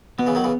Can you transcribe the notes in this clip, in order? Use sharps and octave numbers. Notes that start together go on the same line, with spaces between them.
B2 B3
C#3 E3
D#3 F#3
C#3 E3